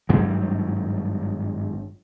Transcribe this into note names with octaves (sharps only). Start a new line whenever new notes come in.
G#1 G2 F#3 G3